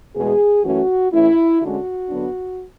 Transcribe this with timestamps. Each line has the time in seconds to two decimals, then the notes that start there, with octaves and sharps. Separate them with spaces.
0.15 E2 B2 G#3 G#4
0.63 F#2 E3 A3 C#4 F#4
1.12 A2 E3 A3 C#4 E4
1.60 D3 G#3 C#4 F#4
2.08 D3 F#3 B3 D4